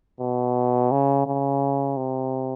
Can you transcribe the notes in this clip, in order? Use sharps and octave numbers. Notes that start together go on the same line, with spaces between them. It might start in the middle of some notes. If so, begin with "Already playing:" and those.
B2
C#3
C#3
C3